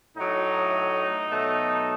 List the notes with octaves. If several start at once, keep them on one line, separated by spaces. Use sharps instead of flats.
A2 F#3 A3 D#4
B2 F#3 A3